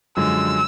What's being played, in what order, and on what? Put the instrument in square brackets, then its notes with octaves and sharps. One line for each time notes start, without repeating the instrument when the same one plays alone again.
[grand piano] F#2 D3 F3 G#3 [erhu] E6